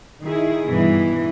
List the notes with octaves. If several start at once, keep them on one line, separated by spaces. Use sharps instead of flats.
D#3 E4 G#4
G2 B2 E3